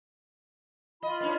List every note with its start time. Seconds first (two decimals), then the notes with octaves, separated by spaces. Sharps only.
1.03 F4 D#5 B5
1.21 B3 C#4 D4